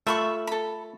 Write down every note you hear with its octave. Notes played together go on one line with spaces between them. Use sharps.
A3 F4 E5 B5 C#6
A4 B5